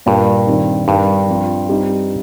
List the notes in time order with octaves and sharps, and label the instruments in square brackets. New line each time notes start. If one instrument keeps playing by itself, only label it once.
[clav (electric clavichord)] G2 [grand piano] A#2 G3 A#3 G4 A#4
[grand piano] D#3 G3 C4 D#4
[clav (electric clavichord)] G2 [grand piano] G3 D#4 A#4 F5
[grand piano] F3 C4 F4
G3 C4 D#4